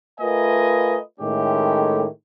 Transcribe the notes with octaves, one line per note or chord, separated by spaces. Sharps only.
A3 F4 A#4 B4 D#5 G#5
A2 D#3 G#3 A3 C#4 G4